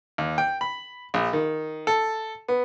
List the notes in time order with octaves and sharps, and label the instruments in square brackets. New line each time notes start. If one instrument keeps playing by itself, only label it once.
[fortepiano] D#2
G5
B5
A#1
D#3
A4
B3